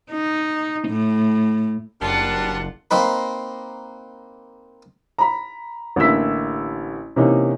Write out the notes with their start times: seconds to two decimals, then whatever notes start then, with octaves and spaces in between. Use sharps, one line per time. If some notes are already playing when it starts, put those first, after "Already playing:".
0.12 D#4
0.87 A2
2.01 F#1 G3 A#3 D4 F4 F#5 A5
2.91 A#3 C4 D#4 B4
5.18 A#5 B5
5.96 A1 D3 A#3 E4 E6 B6
7.16 C3 E3 A#3 C#4 D#4